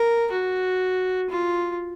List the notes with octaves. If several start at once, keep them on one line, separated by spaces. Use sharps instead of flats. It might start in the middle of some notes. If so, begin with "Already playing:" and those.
Already playing: A#4
F#4
F4